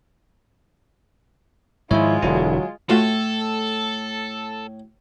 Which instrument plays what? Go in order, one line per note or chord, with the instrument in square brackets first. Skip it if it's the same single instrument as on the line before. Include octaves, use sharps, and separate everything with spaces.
[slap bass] G#2 D#3 F3 [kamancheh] G#3 F4 [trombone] E4 [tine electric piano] C#5
[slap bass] E1 [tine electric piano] D3 D4 E4 [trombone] F#3
[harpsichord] A2 [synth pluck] A3 F4 F#4 [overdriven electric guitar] A4